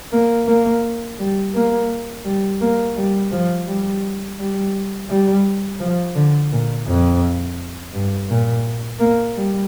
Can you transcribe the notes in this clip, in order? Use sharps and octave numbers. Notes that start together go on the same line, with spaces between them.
A#3
A#3
G3
A#3
G3
A#3
G3
F3
G3
G3
G3
F3
D3
A#2
F2
G2
A#2
A#3
G3